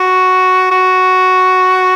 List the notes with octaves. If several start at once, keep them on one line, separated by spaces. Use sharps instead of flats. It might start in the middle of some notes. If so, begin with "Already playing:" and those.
Already playing: F#4
F#4